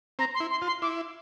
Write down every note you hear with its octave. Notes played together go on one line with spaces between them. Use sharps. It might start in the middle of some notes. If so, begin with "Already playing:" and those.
C4 A#5
C6
E4
C6
F4
C6
E4 D6